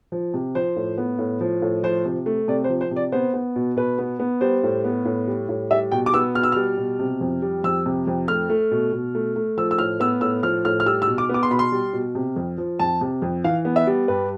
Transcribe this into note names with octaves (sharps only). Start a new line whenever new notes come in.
F3
C3
F3 C5
A2
B3
A2
F3
A2
F3 C5
C3
A3
C3 D5
C5
F3
C5
C3
D5
B3 C5
B3
B2
B2 B4
B3
B3
G3 C5
A2
B3
A2
G3
A2
G3 E5
B2 G5
D6
B3 E6
B2 F6
E6
G3 F6
B2
C3
F2
G3
F2 E6
C3
F2
A3 F6
A3
B2
B2
A3
A3
F3 E6
E6
A2 F6
B3 E6
A2 E6
F3 F6
A2 F6
F6
G3 E6
E6
B2
D6
B3 D6
C6
B2 B5
C6
G3
B2
C3
F2
F3
F2 A5
C3
F2
E3 F5
B3
E5
G3
G2 B4